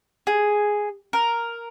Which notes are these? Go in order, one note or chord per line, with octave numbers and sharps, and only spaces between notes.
G#4
A#4